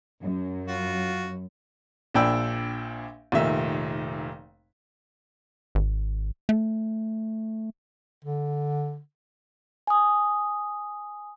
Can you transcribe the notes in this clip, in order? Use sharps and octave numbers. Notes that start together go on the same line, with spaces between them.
F#2
F4 F#4
A#1 A#2 D4 G5 B5 E6
F1 A#2 D#3 E5
G#1
A3
D3
G#5 D#6